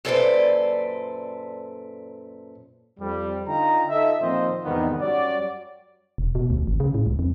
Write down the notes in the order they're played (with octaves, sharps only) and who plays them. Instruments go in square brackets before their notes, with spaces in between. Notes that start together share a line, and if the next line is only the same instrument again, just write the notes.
[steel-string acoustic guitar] F#2 A#2 A4 B4 C5 D5
[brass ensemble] F2 G3
D3 D#4 F4 G5 A#5
D#4 F4 A4 D#5 E5
A#2 D#3 F3 C4 C5 D#5
E2 G#2 C3 D#3 G3 B3
F#2 G3 F#4 C#5 D5
[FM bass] E1
B2
D2
G#1
C#3
A2
C#2
F2